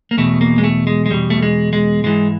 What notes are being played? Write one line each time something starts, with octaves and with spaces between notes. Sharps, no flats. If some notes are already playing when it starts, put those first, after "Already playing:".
A#3
E2 B2 A3
A#3
G#3
A3
G#3
G#3
E2 B2 G3
A3
G#3
G#3
G#2 E3 G#3